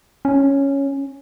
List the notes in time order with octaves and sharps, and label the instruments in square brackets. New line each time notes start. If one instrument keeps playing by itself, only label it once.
[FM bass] C#4